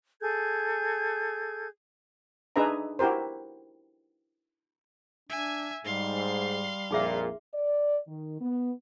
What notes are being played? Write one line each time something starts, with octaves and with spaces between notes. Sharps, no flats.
G#4 A4 G6 G#6
D4 D#4 G#4 B4 E5 A#5
E4 F#4 G4 A#4 C5
D4 E5 G#5
G#2 G3 F5 C6
A#1 F2 A#2 D#4 G#4 E5
D5
D#3
B3